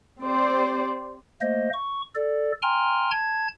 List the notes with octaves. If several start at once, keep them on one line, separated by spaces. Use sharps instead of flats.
C4 G4 C5 D5
A3 A#3 C5 D#5
C#6
A4 D5
G5 G#5 A#5 C6 F6
A5 G#6